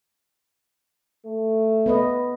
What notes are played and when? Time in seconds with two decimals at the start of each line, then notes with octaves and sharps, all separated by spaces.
1.26 A3
1.86 B3 B4 D#5